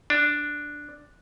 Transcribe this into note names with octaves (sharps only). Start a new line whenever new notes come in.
D4